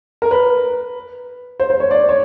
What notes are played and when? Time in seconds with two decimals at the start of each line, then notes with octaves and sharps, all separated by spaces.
0.22 A#4
0.31 B4
1.60 C5
1.70 C5
1.80 C#5
1.91 D5
2.09 C#5